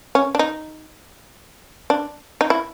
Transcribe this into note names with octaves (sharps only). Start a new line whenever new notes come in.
C#4
D4
D#4
D4
D#4
E4